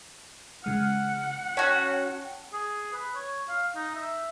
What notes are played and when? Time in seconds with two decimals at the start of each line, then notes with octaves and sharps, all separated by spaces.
0.64 C#3 G#3 F#5 F6
1.57 C#4 F#4 C#5 G5 A5
2.53 G#4
2.93 B4
3.15 C#5
3.49 F5
3.76 D#4
3.95 E5